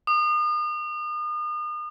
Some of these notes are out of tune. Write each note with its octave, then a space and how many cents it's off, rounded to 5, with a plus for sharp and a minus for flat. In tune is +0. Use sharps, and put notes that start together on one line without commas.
D#6 -40